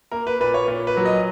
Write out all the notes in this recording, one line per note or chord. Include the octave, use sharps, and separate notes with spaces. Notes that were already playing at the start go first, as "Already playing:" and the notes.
A#3 A#4
B4
A#2 B4
C#5
A#2
B4
F#3
D#5